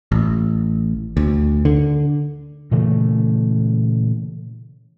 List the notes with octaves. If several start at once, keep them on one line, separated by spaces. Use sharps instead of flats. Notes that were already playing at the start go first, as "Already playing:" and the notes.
A1
D2
D3
A#2 C#3 E3 A3